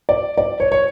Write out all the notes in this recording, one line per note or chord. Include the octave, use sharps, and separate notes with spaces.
D5
D5
C#5
C#5